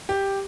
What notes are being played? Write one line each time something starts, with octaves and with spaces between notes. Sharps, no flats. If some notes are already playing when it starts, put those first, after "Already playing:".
G4